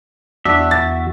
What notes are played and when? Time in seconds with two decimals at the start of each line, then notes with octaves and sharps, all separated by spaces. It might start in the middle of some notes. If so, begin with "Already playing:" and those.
0.45 E2 D4 F#4 E5
0.71 A6